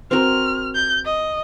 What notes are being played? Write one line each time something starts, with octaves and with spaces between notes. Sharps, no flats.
C4 F#4 A#4 F6
G6
D#5